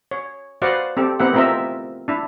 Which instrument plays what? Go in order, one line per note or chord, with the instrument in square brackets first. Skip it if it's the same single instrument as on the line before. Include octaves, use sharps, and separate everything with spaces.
[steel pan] C#5
F#4 B4 C5 D5 F5 F#5
C4 G4 A4
B3 C4 E4 G4 A#4 F#5
A3 C4 F4 A#4 D#5 E5
D4 E4